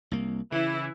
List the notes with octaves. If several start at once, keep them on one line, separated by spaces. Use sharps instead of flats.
C2 A#3
C#3 E3 E4